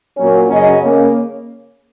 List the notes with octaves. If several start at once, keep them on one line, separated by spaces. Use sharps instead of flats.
A#2 F#3 A#3 C#4
F#2 C#3 F#3 C#4 D#5
C#3 A#3 C#4